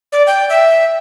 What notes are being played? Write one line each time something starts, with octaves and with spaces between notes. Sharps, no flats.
D5
G5
E5